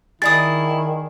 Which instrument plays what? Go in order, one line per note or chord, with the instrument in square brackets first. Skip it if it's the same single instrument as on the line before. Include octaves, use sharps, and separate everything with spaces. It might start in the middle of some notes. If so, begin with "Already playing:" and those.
[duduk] D#3 [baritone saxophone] E4 [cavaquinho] G#4 D5 D#6 [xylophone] A6